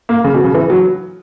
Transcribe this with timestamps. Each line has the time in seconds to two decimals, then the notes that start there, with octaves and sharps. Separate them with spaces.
0.09 A#3
0.24 C#3
0.34 B2
0.44 C#3
0.54 E3
0.70 F#3